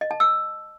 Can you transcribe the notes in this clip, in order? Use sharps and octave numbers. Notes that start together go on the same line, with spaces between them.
D#5
A5
E6